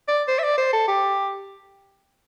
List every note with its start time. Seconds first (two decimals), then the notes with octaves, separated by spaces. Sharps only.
0.08 D5
0.28 C5
0.39 E5
0.43 D5
0.58 C5
0.73 A4
0.88 G4